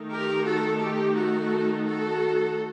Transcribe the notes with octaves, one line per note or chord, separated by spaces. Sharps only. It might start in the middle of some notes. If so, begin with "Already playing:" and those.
Already playing: D#3 A3 D#4
G4 A#4
F#4 A4
G4
F#4 A4
F#4 A4